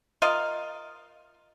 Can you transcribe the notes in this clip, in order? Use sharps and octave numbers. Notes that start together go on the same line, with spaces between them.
F4 A#4 D#5 F5